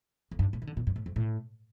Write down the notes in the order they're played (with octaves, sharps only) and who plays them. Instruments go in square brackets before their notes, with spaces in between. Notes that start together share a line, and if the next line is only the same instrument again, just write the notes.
[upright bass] F2
G2
A2
D#3
D3
A#2
G2
A2
F2
A2